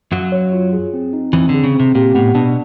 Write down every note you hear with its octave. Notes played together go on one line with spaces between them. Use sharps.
F#2 F#3 F5
C#5
F4
G#4
C4
D#4
E2 E3 C4
D3
G#4
C#3
C4
C3
A#2 G4
A2 B3
B2 D4